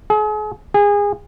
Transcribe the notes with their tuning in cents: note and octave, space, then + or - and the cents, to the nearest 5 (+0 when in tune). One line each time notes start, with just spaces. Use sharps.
G#4 +40
G#4 -25